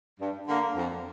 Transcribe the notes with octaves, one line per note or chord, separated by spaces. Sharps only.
G2
D3 A#3
F2